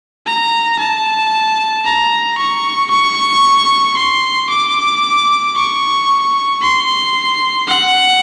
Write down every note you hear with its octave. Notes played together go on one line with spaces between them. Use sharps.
A#5
A5
A#5
C#6
C#6
C6
D6
C#6
C6
F#5